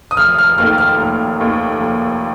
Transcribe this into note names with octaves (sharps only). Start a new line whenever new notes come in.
D#6
F1 F6
F6
D#2 D#3 A3 F6
F6
F1
D#2 D#3 A3
F1